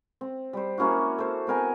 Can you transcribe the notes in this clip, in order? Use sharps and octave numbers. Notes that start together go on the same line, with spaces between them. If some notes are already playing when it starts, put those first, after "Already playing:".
C4
G3 C5
A#3 C#4 E4 F#4
A4 C5
B3 C4 A#4 G#5